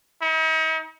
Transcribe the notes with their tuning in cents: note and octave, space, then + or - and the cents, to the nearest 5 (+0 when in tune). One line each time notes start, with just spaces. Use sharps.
D#4 +45